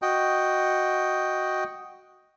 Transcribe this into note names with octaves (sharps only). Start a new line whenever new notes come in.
F#4 D#5 G5